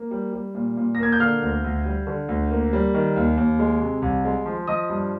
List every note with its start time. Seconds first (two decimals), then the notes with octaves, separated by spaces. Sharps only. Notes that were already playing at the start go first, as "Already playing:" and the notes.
Already playing: A#3
0.11 G3
0.33 G3
0.55 A#2
0.77 A#2
0.95 A#6
0.99 A#3 G#6
1.12 G6
1.20 D3 F5 F6
1.42 D2
1.64 D2
1.85 G3
2.07 D3
2.29 D2
2.51 A#3
2.73 G3
2.94 D#3
3.16 D#2
3.37 D#2
3.59 G#3
3.81 C3
4.02 C2
4.25 G#3
4.46 F3
4.67 F3 D#5 D#6
4.90 G2